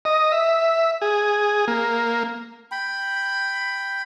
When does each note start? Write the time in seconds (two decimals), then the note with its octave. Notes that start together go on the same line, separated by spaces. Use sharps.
0.05 D#5
0.32 E5
1.02 G#4
1.68 A#3
2.72 G5 B5